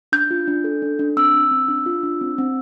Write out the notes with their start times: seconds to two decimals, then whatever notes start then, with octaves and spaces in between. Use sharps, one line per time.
0.12 D4 G6
0.31 F4
0.47 D4
0.64 A4
0.82 D4
0.99 D4
1.17 C4 E6
1.34 C4
1.51 C4
1.68 D4
1.86 F4
2.03 D4
2.21 C4
2.38 C4